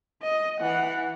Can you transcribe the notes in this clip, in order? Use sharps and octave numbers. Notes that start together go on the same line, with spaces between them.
D#5
E3 F#5